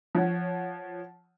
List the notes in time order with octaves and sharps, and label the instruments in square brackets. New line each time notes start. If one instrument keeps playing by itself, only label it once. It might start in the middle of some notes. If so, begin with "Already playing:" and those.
[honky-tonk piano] F3 C#5 F#5